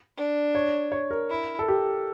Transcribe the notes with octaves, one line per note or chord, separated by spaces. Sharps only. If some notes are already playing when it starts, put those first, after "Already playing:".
D4
C#5
C#5
A#4
E4
A4
G4